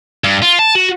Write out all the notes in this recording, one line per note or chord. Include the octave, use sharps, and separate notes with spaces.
G2
F4
A5
F#4